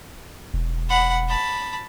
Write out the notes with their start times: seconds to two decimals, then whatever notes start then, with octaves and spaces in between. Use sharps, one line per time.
0.54 E1
0.89 F#5 B5
1.29 A5 B5